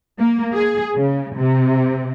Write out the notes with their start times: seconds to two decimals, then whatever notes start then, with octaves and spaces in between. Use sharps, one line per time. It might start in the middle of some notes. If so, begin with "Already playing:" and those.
0.19 A#3
0.54 G#4
0.96 C#3
1.36 C3